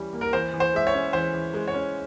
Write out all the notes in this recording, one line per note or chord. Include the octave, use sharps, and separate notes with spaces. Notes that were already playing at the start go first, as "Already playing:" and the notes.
Already playing: E3 G3 C#4
A#3
A#4
E3 C5
E3
C5
G#3 E5
C#5
C#4
E3 C5
E3
G#3
C#5
C#4